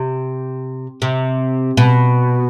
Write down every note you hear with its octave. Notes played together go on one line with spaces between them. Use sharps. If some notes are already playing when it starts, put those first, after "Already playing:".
Already playing: C3
C3
B2